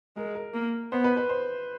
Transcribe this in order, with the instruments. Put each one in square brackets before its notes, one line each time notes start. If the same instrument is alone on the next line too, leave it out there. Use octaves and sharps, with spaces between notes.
[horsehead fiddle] G#3 [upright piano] A#4
[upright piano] A#4
[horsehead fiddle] A#3
[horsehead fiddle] B3 [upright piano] C5
[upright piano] B4
B4
C5